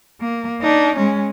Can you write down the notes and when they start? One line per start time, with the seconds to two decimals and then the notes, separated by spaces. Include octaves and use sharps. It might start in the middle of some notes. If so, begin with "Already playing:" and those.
0.21 A#3
0.62 D4 D#4
0.96 G#3 C#4